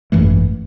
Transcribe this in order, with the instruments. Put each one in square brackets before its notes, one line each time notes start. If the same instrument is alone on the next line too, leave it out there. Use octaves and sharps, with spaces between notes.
[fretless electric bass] G#1 F#2 E3 A3